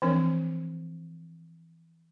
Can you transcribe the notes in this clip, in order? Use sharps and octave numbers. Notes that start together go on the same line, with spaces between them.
E3 F3 C4 D4 A#4 C#5